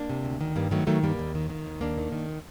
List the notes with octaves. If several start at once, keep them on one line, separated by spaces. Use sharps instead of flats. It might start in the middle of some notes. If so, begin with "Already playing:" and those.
Already playing: A#3 D4
C3
D2
D#3
G2 G3 A#3
D#3 F#3 A3
D#3 F#3 A3
G2 G3 A#3
D#2
D#3
D#3
D#2
D#2 A#3 D4
D#3
D#3